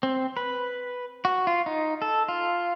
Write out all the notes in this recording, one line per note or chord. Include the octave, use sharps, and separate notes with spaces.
C4
B4
F#4
F4
D#4
A4
F4